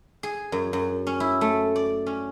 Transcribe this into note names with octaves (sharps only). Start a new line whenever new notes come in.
G#4
F#2
F#2
C#4
E4
A3
D5
C#4